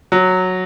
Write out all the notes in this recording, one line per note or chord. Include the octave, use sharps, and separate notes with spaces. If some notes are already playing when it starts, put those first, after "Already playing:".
F#3